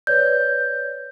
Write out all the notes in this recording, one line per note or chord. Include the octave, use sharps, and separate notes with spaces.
B4 C#5 D5 G6